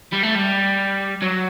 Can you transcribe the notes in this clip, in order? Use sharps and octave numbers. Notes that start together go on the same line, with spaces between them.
G3
A3
G3
F#3